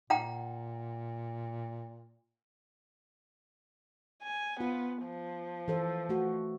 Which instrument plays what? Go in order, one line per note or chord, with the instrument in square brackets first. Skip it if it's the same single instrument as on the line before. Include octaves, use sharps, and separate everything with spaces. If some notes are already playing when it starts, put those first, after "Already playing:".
[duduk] A#2 [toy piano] F#5 G5 A#5
[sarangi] G#5
[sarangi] B3 [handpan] F4
[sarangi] F3
[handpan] E3 A4 C5
A3 F#4